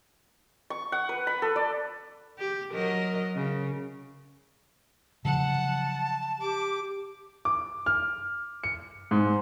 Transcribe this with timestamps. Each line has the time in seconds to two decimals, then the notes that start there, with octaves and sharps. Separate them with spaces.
0.70 C#6
0.92 F#5
1.09 B4
1.27 B5
1.42 A4
1.56 D5
2.39 G4
2.73 F#3 A#4 D#5
3.35 C#3
5.25 C#3 F3 F#3 F#5 A5
6.41 G4 D6
7.45 D6
7.86 F6
8.64 C#7
9.11 G#2